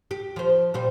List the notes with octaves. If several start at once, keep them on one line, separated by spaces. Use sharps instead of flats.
G4
F3 C5
A#2 G3 C5